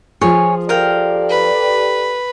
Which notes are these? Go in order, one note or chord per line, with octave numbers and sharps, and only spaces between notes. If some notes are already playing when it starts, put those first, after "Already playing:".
F3 F4 G#4 C#5 G#5
G4 A4 A#4 D5 F5 G5
B4